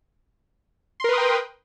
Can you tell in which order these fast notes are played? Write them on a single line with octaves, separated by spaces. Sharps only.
C6 A#4 B4 D#6 G5